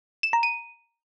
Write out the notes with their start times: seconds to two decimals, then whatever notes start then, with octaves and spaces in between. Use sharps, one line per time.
0.23 E7
0.33 A#5
0.43 D#7